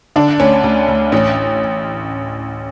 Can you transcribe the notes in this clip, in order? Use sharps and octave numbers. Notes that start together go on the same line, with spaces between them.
D3 D4
D2 C#4
D2
D2
A1 C#4